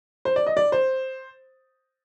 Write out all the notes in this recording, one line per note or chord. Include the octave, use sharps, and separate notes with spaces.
C5
D5
D#5
D5
C5